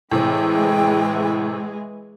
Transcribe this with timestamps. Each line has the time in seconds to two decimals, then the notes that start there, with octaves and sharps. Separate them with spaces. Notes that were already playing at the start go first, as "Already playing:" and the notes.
0.11 A2 C3 E3 G#3 G#4 G5